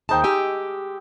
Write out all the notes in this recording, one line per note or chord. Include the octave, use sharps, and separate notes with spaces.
D#2 G#3 D#4 C5 G5 A5
G4 G5 G#5 E6